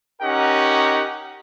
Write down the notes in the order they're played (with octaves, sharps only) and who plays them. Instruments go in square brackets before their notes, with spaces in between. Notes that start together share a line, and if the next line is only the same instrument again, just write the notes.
[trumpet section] C#4 D#4 G4 A#4 F#5